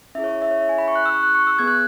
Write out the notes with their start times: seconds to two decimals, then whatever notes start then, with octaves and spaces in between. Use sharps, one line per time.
0.15 C#4 E4 G#4 E5
0.24 C#5
0.42 E5
0.51 C#5
0.61 E5
0.69 G#5
0.78 B5
0.88 C#6
0.95 F#6
1.06 E6
1.15 C#6
1.23 F#6
1.35 C#6
1.47 E6
1.59 B3 G#4 G#6
1.68 F#6